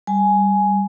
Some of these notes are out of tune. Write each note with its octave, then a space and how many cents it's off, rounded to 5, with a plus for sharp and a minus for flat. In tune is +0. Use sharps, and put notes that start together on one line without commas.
G3 +0 G#5 +10